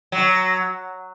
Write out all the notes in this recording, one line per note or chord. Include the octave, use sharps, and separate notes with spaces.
F#3